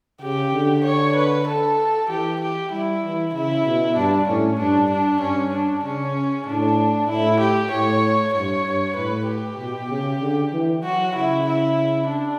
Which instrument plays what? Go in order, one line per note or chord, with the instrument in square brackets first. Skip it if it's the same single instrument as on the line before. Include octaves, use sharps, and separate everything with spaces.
[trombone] C#3 [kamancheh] G4
[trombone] D3
[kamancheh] C#5
B4
A4
[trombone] E3 [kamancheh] G4
[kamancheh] G4
[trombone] G3 [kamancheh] E4
[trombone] E3
[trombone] C#3 [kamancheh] E4
[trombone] B2
[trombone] G2 [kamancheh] D4
[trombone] A2 [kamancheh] C#4
[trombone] G2 [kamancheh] D4
[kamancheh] D4
[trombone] G2 [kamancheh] C#4
[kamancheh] D4
[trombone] C#3 [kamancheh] C#4
[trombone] A2 [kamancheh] D4
[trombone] A2 [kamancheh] E4
[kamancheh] G4
[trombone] A2 [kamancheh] C#5
[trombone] G2 [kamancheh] C#5
[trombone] G2
[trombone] A2 [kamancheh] B4
[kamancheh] G4
[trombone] B2
C#3
D3
E3
[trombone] F#3 [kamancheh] F#4
[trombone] C#3 [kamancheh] E4
[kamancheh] E4
D4